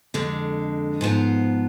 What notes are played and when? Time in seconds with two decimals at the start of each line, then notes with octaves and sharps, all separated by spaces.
0.14 F2 D3 G#3
1.01 G#2 F3 B3 F4